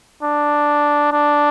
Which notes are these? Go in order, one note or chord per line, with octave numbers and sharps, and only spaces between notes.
D4
D4